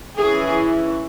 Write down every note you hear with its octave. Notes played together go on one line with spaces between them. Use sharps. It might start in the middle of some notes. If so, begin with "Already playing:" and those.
E3 C#4 E4 G#4